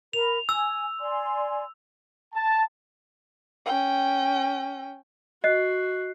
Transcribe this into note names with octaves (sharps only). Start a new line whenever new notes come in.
A#4 B5 F7
G#5 E6
D5 G#5 C6
A5
C#4 G5
F#4 D#5 F#6 C7